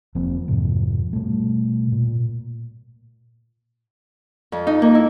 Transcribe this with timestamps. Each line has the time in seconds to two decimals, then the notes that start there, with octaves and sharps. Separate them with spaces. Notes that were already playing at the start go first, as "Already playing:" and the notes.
0.15 F1 F3 A#3 C4
0.48 F2 G#2 C3 F3
1.13 B2 G3 A3
1.92 A#2
4.52 F2
4.67 D#4
4.82 A#3
4.95 E4